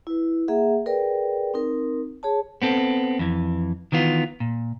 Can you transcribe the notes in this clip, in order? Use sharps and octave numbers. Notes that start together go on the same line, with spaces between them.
E4 B4
A#3 G#4 E5 F#5
G#4 A#4 B4 D5 G5
C4 D#4 A#4
G#4 C#5 A5
B3 C4 A4
F2 E3
D#3 E3 B3 F4
A#2